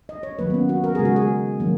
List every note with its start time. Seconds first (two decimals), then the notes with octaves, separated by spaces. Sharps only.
0.09 D#5
0.23 C#5
0.39 D#3 F#3 A#3 B4
0.50 B3
0.54 C#4
0.69 F#4
0.84 A#4
0.95 C#3 G#3 G#4
1.05 F#4
1.16 G#4
1.60 D#3 F#3 A#3